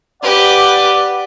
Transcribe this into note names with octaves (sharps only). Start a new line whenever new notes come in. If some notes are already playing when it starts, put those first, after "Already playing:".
G4 B4 D5 F#5